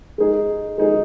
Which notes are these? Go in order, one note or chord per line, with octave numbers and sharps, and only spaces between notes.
G#3 D#4 G#4
G#3 D#4 G#4